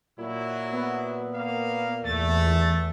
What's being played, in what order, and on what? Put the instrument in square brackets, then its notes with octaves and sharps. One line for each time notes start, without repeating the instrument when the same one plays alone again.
[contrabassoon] A#2 [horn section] F#3 E4
[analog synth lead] B3
[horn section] A#3 F5
[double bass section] E2 [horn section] A3 [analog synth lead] A6